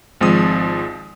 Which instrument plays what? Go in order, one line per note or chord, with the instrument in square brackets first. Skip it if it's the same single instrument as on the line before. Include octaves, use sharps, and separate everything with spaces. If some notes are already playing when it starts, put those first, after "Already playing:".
[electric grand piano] G#1 F3 G#3 C4 D#6